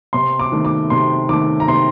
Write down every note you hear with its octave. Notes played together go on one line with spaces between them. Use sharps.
C3 C6
D6
D#3 A3
D6
C3 C6
D#3 A3 D6
A#5
C3 C6